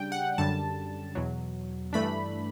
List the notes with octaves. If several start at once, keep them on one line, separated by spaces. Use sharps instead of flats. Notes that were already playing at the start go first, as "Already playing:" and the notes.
Already playing: C#3 G3 D4 G5
F#5
F#2 D3 G3 A5
E2 B2 F#3
G2 E3 A3 D4 B5